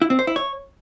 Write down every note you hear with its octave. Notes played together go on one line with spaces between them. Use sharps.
E4
C4
C5
E4
C#5